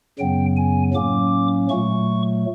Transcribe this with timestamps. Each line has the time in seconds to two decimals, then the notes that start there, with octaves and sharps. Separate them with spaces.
0.19 F#2 C#3 F#3 B3 G5
0.57 G#5
0.94 A2 F#3 A#3 C#4 D6
1.69 A#2 F#3 A3 C#6